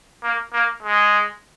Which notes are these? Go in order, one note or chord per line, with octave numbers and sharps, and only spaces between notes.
A#3
A#3
G#3